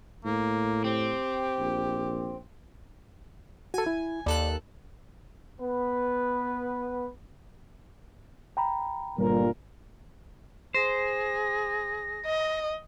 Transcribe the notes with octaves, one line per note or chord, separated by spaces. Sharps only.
A2 A#3
C4 G4
A#1
F#4 A4 G#5
E4
D#2 A4 D5 F#6
B3 B4
G5 A#5 B5
G1 A#2 G3 A#4
G#4 C5 A#6
D#5